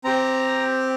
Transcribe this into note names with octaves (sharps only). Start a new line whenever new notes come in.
C4 G4 A#5